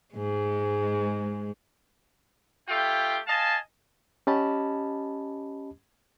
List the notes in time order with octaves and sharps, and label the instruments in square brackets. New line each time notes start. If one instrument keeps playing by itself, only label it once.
[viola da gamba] G#2 G#3
[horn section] A3 F4 G4 G5
D#5 F5 G#5 A5
[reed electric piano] C#4 G4 D#5 A5 B5